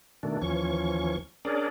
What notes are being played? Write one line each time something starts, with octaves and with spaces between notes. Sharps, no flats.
B2 D#3 A3 D4
D#2 E3 F3 C#4 C#6
C#4 D4 G#4 A#4 D5